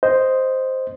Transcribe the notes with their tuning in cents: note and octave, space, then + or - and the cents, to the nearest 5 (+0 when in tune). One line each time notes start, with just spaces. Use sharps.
C5 +0 D#5 +0